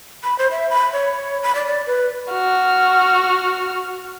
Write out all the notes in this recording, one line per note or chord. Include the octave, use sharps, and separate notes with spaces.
B5
C5
E5
B5
C#5
B5
D5
D5
B4
F#4 F6